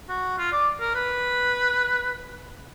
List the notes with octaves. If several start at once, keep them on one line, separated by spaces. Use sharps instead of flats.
F#4
F4
D5
A#4
B4